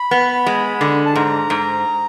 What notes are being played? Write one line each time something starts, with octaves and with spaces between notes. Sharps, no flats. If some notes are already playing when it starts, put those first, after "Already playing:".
Already playing: B5
B3
G#3
D3
A5
G#2 A#5
G#2